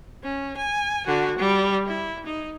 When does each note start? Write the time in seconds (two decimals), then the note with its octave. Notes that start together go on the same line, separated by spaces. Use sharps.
0.23 C#4
0.57 G#5
1.06 D3 F#4
1.39 G3
1.87 E4
2.26 D#4